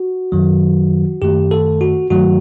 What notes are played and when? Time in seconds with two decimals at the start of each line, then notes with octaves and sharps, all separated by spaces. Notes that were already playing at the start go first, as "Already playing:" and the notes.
Already playing: F#4
0.32 F#2 D#3 F#3
1.22 F#2 D#3 A3 G4
1.51 A4
1.81 F#4
2.10 G2 D#3 F#3 A3 F#4